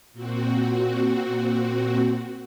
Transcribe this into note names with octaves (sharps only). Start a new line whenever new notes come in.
A#2 C4 F#4